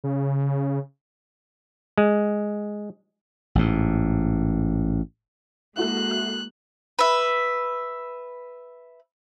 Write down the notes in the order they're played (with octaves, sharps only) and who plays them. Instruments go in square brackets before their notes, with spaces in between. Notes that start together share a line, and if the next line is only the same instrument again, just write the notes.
[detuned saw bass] C#3
[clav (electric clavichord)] G#3
[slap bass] A1 G#2
[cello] G#3 A#3 [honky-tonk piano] E4 F#4 A4 [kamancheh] F#6
[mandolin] B4 E5